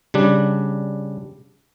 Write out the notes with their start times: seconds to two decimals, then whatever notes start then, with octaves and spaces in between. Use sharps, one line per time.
0.14 C#3 G3 D4